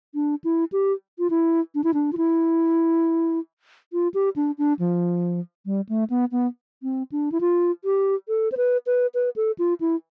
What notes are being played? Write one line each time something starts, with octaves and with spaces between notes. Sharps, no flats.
D4
E4
G4
F4
E4
D4
E4
D4
F4
E4
F4
G4
D4
D4
F3
G3
A3
B3
B3
C4
D4
E4
F4
G4
A4
C5
B4
B4
B4
A4
F4
E4